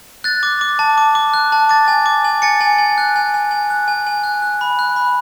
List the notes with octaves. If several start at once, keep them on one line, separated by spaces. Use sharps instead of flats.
F#6 A6
D6
D6
A5
D6
D6
F#6
A5
D6 A6
G#5
D6
G#5
G#5 A6 C#7
G#5
G#5
F#6
G#5
G#5
G#5
F#6
G#5
G#5
F#6
F#6
B5
F#6
B5